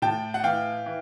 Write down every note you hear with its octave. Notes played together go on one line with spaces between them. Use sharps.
A2 G5 A5
F#5
E3 F5 G5
E3